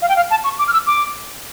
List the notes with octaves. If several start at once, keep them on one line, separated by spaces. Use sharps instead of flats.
F5
G5
F5
A5
C#6
D6
F6
E6
D6